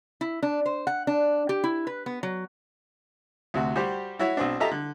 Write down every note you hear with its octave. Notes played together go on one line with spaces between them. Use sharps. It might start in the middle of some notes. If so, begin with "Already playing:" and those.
E4
D4
C5
F#5
D4
G4
E4
B4
B3
F#3
D2 C3 F#4
G3 F#4 G4 C5
E4 F#4 C#5 E5
B1 C4 D4
F4 G4 A4 D#5 E5 A#5
D3